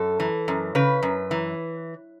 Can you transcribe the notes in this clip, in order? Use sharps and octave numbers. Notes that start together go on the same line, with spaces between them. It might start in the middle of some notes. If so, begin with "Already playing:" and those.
Already playing: F#2 A4
E3
F#2
C#3 B4
F#2
E3